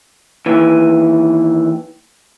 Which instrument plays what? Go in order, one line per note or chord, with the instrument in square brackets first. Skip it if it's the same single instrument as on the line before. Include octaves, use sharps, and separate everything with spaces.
[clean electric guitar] D#2 E3